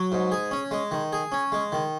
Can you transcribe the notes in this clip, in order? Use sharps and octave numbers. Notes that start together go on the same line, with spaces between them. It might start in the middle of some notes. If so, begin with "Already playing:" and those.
Already playing: F#3
G#2
G#4
C#4
G#3
D#3
G#4
C#4
G#3
D#3